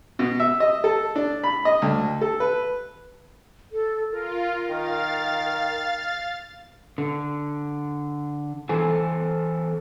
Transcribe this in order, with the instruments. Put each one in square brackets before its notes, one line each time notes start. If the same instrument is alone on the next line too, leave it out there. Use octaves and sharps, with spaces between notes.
[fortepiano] B2
E5
D#5
A4
D4
B5
D#5
D2
A4
B4
[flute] A4
[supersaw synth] F4 [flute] A#4
[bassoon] D#3 [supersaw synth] F5 A6
[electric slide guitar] D3
E3 A4 C5 G#5